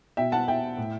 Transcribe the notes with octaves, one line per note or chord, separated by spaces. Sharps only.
B2 E5 G5
F#5 A5
B2 E5 G5
A2